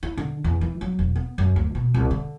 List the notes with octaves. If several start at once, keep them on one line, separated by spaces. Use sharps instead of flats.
E4
D3
E2
E3
F#3
E1
B3
F#2
D2
B2
C2
D3